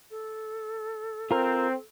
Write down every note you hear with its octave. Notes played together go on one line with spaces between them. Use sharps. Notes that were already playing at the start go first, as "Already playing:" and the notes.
A4
C4 F4 A#4